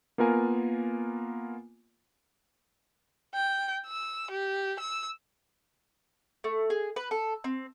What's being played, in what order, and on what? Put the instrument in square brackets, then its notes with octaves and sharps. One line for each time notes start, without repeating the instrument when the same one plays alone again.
[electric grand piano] A#3 B3 F4 A#4 G#5
[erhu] G5
E6
G4
E6
[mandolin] A3
G#4
B4
A4
C4